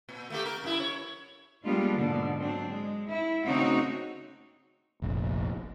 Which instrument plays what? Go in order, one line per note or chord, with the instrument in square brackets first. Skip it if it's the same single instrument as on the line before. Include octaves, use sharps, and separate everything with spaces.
[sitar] A#2
A3 A#3 G4
A#4
F#2 E4
C#5
[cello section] G3 G#3 A#3 B3 D4 F4
G#2 B2 D3
F#3 C4 D4
G#3
E4
C#3 A3 C4 D#4 F#4 C#5
[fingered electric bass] F1 A#1